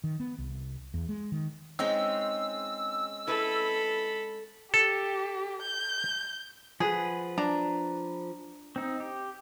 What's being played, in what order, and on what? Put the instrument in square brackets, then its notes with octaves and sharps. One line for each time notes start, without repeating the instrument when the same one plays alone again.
[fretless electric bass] D#3
B3
C2
E2
G#3
D#3
[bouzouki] G#3 C4 C#4 [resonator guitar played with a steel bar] D#4 [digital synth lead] E6
[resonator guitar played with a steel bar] E4 B4 [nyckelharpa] A4 B5
[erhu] G4 [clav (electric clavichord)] A4
[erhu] G6
[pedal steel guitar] F3 B4 F#5 [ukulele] G#4
[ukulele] D4 A#5
[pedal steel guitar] C4 D#4
G4